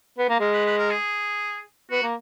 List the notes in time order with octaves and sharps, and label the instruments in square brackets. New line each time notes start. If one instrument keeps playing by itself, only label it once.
[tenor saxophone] B3
A#3
[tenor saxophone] G#3 [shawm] A#4
[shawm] B4
B4
A#4
G#4
[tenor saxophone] B3 [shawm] F#4
[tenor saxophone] A#3